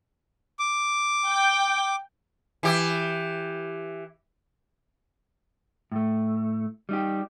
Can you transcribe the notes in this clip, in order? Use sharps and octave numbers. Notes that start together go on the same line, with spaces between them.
D6
G5
E3 G4
A2 A3
G3 D#4 G4